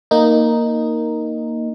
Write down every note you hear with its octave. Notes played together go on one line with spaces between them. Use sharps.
A#3 D#4